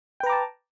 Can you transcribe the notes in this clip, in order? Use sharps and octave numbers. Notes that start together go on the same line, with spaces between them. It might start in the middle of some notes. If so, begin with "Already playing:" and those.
B4 G5 A5 A#5 D6